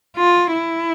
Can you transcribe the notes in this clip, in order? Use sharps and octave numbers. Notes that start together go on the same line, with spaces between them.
F4
E4